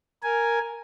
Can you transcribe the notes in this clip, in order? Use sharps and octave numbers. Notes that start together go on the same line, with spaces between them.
A#4 G#5